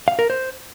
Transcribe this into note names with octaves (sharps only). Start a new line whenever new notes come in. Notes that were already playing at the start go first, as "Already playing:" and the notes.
F5
A#4
C5